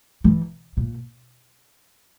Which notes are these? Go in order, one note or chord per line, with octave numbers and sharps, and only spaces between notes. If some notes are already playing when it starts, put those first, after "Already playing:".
E3
A#2